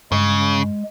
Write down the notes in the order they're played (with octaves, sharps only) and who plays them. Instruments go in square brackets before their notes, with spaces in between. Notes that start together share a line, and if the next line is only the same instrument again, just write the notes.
[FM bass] G2 [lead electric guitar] C#3 [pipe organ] G#3